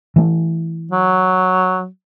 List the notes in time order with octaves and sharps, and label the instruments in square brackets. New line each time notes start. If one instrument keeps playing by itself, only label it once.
[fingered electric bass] E3 A3
[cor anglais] F#3